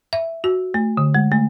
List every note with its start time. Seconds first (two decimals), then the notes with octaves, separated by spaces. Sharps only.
0.13 E5
0.44 F#4
0.74 A3
0.97 D3
1.14 G#3
1.32 A3